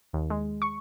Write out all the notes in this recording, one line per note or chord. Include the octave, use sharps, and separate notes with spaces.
D#2
G#3
C#6